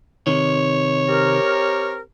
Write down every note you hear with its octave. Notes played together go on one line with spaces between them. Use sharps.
C3 D#3 C#5
C4 G4 A#4